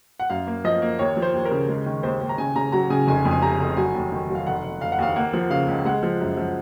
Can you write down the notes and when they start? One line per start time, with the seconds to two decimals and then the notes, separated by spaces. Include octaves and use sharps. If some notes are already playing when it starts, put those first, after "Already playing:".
0.20 F#5
0.30 F#2 F5
0.47 A#3
0.64 F3 D#5
0.82 A#3
0.99 D#2 C#5
1.17 F3
1.22 C5
1.34 D#2
1.45 A#4
1.51 C#3
1.68 G#3
1.86 D#3
2.03 D#2 C5
2.21 D#2
2.29 A#5
2.38 C#3 G#5
2.56 C#3 A#5
2.72 F#3 A#5
2.90 C#3 G#5
3.07 F1 G#5
3.25 F2
3.31 G#5
3.42 C3 A#5
3.60 F1
3.77 F#3 G#5
3.94 D#2
4.12 D#3
4.30 F#3
4.35 F5
4.47 F1 F#5
4.64 F1
4.81 F1 F5
4.92 F#5
4.98 D#2 F5
5.16 A#3 F#5
5.33 F3
5.50 C#3 F5
5.68 C#2
5.85 G#3 F#5
6.03 F3
6.20 F#2
6.37 F3